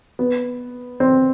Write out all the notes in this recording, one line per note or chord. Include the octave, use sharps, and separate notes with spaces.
B3
C4